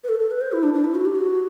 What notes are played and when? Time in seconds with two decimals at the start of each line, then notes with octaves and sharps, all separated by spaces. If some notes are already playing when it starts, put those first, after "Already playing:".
0.04 B4
0.09 A4
0.19 A4
0.31 B4
0.41 C5
0.52 E4
0.63 D4
0.74 D4
0.84 E4
0.95 F#4
1.05 G4
1.15 F#4